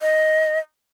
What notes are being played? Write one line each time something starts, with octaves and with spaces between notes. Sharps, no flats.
D#5